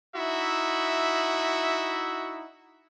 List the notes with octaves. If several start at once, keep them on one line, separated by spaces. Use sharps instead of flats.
D#4 E4 F#4 E5